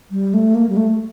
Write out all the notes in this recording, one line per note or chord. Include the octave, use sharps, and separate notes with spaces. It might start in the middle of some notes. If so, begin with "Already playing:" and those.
G3
A3
A#3
G3
A3